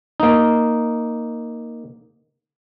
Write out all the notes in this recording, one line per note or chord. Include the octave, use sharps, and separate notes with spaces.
A#3 D#4